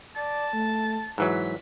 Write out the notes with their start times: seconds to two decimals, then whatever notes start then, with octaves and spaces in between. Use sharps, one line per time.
0.16 D5 A5
0.53 A3
1.18 G#2 E3 F#3 B6